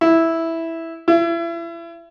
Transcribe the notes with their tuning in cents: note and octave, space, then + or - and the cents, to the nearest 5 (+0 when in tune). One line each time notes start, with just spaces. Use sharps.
E4 -5
E4 +35